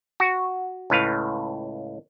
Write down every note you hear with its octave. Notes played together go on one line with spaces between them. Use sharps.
F#4
C#2 A2 B4 F5